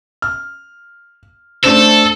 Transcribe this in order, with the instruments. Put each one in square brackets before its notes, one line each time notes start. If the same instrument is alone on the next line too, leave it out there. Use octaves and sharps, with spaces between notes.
[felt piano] F6
[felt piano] A3 D4 C5 [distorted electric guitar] A4